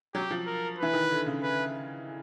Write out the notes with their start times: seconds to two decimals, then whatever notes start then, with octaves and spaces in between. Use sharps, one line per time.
0.14 F#3 G4
0.31 F3
0.46 A#4
0.78 E3 B4
0.94 D#3
1.11 D3
1.26 C#3
1.42 B4